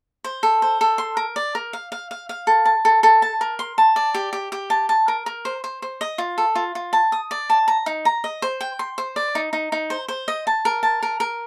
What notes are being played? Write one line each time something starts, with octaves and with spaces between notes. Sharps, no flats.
C5
A4
C5
A4
C6
A#4
D5
A#4
F5
F5
F5
F5
A4
A5
A4
A4
A5
A#4
C6
A5
D5
G4
G4
G4
A5
A5
A#4
A#4
C5
C5
C5
D#5
F4
A4
F4
F4
A5
D#6
D5
A5
A#5
D#4
A#5
D#5
C5
G5
C6
C5
D5
D#4
D#4
D#4
C5
C5
D#5
A5
A#4
A5
A#4
A#4